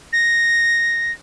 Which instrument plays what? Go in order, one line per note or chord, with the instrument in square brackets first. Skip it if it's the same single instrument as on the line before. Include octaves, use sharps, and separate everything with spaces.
[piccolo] A#6